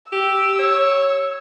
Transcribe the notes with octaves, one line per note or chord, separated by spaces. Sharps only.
G4 E6
C#5